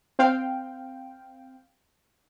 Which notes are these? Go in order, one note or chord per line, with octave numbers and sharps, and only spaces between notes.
C4 F5 G5